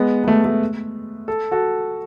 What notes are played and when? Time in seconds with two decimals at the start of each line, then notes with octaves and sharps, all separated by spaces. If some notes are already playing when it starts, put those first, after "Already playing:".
Already playing: G#3 B3
0.24 B3
0.28 A3
0.45 A3
1.28 A4
1.51 F#4 A4